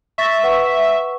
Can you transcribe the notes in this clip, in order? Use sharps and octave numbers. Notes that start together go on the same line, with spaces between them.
E5 C#6 A6 A#6
B4 F#5 C#6